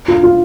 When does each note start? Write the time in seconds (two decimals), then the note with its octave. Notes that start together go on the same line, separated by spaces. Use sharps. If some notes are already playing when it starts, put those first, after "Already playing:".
0.08 F4
0.23 F4